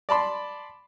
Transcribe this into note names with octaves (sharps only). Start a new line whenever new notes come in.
D5 A5 B5 C6